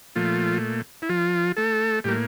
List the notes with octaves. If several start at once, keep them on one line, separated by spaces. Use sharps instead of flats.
A#2 F3 A3 F4
E4
F3 F4
A3 A4
A2 G3 A#3 G4